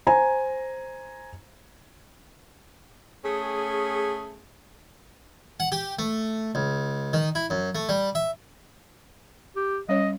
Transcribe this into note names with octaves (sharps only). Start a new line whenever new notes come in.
C5 G#5 A#5
A3 C#4 G#4
F#5
G4
A3
C#2
D#3
E4
F#2
A3
G3
E5
G4
G3 C#4 C#5 D#5